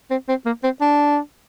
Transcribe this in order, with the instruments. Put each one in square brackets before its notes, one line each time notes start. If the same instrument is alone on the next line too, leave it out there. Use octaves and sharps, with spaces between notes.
[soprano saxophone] C4
C4
A#3
C4
D4